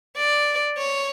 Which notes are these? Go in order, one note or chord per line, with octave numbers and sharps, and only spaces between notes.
D5
C#5